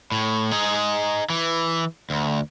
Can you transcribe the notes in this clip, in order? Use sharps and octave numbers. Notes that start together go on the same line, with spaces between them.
A2
D#4 G#4
E3
D2